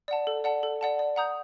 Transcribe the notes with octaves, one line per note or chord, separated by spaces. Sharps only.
D5 F#5 A5
A4
D5 F#5 A5
A4
D5 F#5 A5
D5
F#5 A#5 D#6 G6